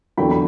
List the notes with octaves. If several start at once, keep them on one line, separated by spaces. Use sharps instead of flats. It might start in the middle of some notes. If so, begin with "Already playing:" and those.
E2 D3 F#3 G5 B5
B5